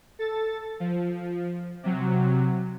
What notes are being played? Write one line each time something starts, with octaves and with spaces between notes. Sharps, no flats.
A4 A6
F3
C3 F#3